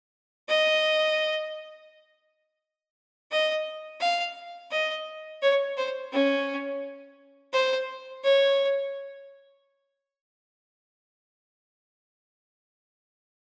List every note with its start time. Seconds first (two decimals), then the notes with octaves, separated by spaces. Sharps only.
0.49 D#5
3.31 D#5
4.01 F5
4.71 D#5
5.42 C#5
5.78 C5
6.13 C#4
7.53 C5
8.24 C#5